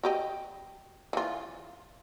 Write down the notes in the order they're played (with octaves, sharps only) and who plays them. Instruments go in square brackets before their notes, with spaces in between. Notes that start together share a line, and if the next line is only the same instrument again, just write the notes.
[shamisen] F#4 G4 D#5
E3 F4